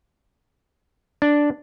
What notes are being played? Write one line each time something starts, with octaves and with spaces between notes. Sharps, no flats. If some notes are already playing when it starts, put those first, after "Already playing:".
D4